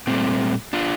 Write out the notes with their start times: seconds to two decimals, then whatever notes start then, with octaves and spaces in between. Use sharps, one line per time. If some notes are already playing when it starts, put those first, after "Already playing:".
0.07 A#2 G3 A3 C4
0.73 D4 F4